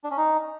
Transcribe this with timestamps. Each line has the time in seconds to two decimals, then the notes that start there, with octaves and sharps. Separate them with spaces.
0.04 D4
0.11 C#4
0.17 D#4